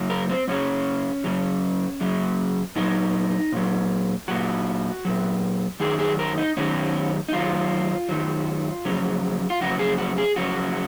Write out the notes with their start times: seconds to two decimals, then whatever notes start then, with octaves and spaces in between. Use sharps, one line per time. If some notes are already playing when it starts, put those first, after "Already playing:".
Already playing: F#2 C#3 F#3
0.10 A#4
0.29 C4
0.48 F#2 C#3 F#3 C#4
1.24 F#2 C#3 F#3
2.01 F#2 C#3 F#3
2.76 A#2 F#3 D#4
3.52 A#2 F#3
4.28 A#2 F#3 F#4
5.05 A#2 F#3
5.80 F#2 D#3 F#3 G#4
5.99 G#4
6.19 A#4
6.38 D#4
6.57 F#2 D#3 F#3 C#4
7.29 D#4
7.32 F#2 D#3 F#3 F4
8.09 F#2 D#3 F#3
8.85 F2 C#3 F#3
9.50 F4
9.61 F2 C#3 F#3 F#4
9.79 G#4
9.98 F#4
10.18 G#4
10.36 F2 C#3 F#3 F#4